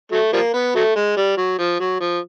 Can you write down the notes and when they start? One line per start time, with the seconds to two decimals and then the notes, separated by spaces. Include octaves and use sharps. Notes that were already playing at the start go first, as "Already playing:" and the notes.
0.12 F#3 A3
0.33 F3 G3 A#3
0.54 B3
0.75 F#3 A3
0.96 G#3
1.17 G3
1.37 F#3
1.58 F3
1.80 F#3
2.00 F3